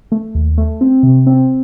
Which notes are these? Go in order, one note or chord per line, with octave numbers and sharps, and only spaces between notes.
A3
D#2
A3
C4
C3
C4